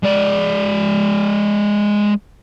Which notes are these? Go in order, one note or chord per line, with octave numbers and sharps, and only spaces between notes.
G#3 D5